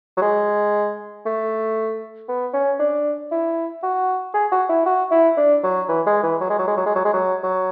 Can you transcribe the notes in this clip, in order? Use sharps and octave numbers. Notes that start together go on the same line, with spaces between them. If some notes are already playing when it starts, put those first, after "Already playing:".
F#3
G#3
A3
B3
C#4
D4
E4
F#4
G#4
F#4
E4
F#4
E4
D4
F#3
E3
G#3
E3
F#3
G#3
F#3
G#3
F#3
G#3
F#3
G#3
F#3
F#3